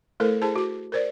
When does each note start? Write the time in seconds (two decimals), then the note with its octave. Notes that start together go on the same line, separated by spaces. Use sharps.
0.20 A3 E4 A4 A#4 C5
0.42 E4 G#4 C5 A5
0.56 F#4 D6
0.92 A#4 C5 D5